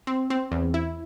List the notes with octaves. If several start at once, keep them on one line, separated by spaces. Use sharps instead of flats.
C4
C4
E2
E4